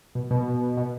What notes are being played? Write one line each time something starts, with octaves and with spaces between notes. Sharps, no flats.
B2
B2
B2